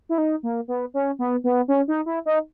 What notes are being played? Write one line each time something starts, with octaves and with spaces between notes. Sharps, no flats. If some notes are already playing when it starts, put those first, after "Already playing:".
E4
D#4
A#3
B3
C#4
B3
B3
C#4
D#4
E4
D#4